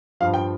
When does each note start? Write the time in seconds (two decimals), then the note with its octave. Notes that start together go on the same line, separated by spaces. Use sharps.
0.20 G2 F3 F5
0.34 G5